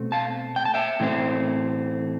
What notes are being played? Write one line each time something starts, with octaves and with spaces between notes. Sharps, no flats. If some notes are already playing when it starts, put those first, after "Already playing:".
Already playing: B2 A3 C4
F5 A5
G5
A5
E5 G5
A2 E3 A3 C4